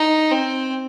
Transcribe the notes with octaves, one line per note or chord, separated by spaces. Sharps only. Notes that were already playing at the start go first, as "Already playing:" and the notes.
Already playing: D#4
C4